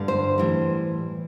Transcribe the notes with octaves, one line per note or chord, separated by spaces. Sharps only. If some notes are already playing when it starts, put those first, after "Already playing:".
Already playing: G2 D3 G3
C5
A2 E3 G3